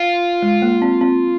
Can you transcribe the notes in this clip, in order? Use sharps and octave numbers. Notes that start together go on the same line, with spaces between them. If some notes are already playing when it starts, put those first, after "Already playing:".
Already playing: F4
G#3
A#3
C4
C4